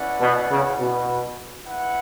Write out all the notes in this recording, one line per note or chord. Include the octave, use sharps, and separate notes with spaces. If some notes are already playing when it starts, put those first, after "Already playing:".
Already playing: C#4 E4 B4 D5 F#5
B2
C#3
B2
E4 B4 F#5